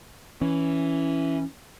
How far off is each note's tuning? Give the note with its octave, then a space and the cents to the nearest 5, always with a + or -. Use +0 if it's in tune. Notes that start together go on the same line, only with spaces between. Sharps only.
E3 +0 C#4 +0